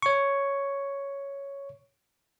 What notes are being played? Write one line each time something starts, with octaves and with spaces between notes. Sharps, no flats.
C#5 C#6